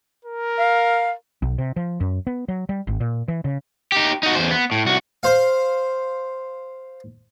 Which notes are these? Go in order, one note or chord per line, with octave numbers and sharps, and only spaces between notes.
A#4
F5
B1
C3
F3
F#2
B3
F#3
G3
G#1
A#2
E3
C#3
D#4 G4
D#4 F#4
E2 C5
B3
A2
C2 F#4
C5 F5